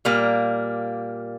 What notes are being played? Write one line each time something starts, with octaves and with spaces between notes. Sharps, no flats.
A#2 G3 A#3